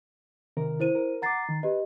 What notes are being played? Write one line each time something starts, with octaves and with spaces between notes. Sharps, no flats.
C3 D#3 A#4
E4 C5 D#7
A#4
F#5 A#5 D6 A6 C7
D#3
G4 B4 D#5